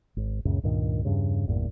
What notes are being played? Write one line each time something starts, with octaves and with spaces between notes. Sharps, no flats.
G#1
C#2 F#2 A#2 C#3
C#2 G2 A#2 D#3
E2 G2 C#3
G#1 E2 G2 A#2